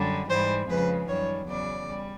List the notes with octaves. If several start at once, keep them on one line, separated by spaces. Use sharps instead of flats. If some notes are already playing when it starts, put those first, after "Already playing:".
Already playing: F#2 D3 G3
G#2 E3 G3 C5
F2 C#3 F3 G#3 B4
F#2 D#3 G3 C#5
E2 C#3 F#3 D5
G3